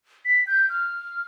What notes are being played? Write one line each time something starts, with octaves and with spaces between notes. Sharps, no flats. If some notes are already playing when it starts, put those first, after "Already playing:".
B6
G6
F6